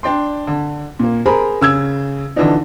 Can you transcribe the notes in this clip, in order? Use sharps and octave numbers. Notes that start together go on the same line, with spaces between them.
D4 D5 G5 C6
D3
A#2 A#3
G#4 A#4 C5 A#5 B5
C#3 E6 G#6
D3 E3 F3 D4 D#4